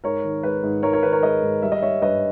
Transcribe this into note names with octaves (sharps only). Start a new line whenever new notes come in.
G#2 A#4 C#5
D#3
G#3 B4
G#2
G#2 A#4 C#5
A#4 C#5
D#3 B4
A#4 C#5
G#3 B4 D#5
G#2
G3 E5
D#5
G3 C#5 E5
G2 B4 D#5